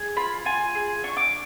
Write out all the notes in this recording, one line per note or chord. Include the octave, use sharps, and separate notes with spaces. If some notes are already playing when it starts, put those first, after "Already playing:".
Already playing: G#4
F4 B5
F4 G#5
G#4
D4 C#6
D6